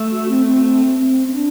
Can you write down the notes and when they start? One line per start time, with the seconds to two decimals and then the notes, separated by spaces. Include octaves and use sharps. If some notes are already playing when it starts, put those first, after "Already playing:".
Already playing: A3
0.11 F#4
0.28 C4
0.46 C4
0.64 C4
0.99 C4
1.27 C4
1.33 D4